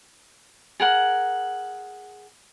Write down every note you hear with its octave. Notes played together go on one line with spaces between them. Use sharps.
G#4 A#4 F#5